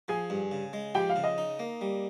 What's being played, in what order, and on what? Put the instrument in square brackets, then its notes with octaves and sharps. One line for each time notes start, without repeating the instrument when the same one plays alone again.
[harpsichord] F3 [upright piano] G#4 G#5
[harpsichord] G2
C#3
G#3
[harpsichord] F3 [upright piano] G4 G5
[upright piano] F5
[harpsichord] C#3
[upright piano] D#5
[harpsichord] D#4
A#3
G3